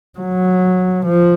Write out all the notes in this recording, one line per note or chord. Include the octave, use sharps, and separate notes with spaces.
F#3
F3